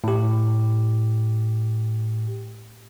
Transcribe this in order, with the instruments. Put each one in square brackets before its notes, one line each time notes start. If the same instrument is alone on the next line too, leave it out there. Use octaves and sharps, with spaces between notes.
[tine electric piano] A2 G4